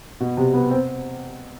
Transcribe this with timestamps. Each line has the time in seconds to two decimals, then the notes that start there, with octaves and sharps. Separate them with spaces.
0.20 B2
0.37 C3
0.54 B3
0.70 C4